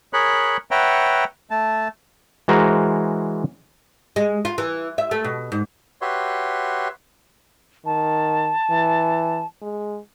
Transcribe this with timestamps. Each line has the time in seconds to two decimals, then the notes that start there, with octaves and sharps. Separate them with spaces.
0.13 G#4 A#4 C#5 B5 F#6
0.71 B4 C#5 E5 F#5 G5 A#5
1.51 A3 A5
2.48 E3 G#3 F#4 A#4 C5 A#5
4.16 G#3
4.45 F4
4.58 E3
4.98 E5
5.11 A3
5.24 B2
5.52 G#2
6.01 F#4 G4 B4 C#5 E5 C6
7.86 D#3 A5
8.70 E3
9.62 G#3